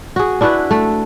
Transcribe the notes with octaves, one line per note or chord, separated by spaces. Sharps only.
F#4 G#4
D4 E4 F#4 B4
A3